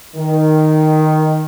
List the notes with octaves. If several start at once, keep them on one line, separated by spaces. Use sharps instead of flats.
D#3